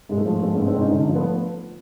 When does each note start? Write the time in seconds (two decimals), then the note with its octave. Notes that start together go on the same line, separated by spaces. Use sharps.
0.09 G#2 G#3
0.17 A3
0.26 F3
0.41 G#3 A3 B3
0.54 B3 C#4
0.58 G#2
0.66 C4 D4
0.75 G#2 C#4 D#4
0.91 D3 C#4 D#4
1.07 F3
1.15 A3 B3